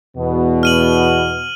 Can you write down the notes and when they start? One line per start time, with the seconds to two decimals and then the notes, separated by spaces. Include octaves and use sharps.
0.17 E2 B2
0.63 F6 D#7 F#7